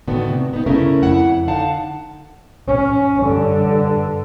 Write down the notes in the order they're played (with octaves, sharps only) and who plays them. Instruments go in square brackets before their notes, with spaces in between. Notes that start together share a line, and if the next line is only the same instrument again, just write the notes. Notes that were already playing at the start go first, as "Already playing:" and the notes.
[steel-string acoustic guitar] A2 D3 D#3 B3 F#4
C3
B3 D#4
C#3 A3 C#4 E4 A#4
F2 E4 F#5
D3 D#4 F5 F#5 A5
[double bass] C#4
G2 D3